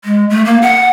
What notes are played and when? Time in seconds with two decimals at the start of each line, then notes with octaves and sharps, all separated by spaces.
0.05 G#3
0.30 A3
0.45 A#3
0.62 F#5